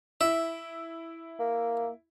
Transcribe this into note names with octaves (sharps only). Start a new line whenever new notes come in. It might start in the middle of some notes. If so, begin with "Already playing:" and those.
E4 E5
A#3